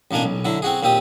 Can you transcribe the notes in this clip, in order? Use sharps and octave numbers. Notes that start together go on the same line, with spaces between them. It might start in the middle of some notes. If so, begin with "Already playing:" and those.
A1 B2 A#3 D4 G#5
B1
D3 F#3 E4
C4 F#4 G#4
D#2 A#2 C4 G4 D#6